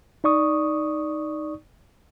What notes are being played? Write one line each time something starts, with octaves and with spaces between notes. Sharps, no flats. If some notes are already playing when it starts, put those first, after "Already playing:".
D#4 D5 C#6 D#6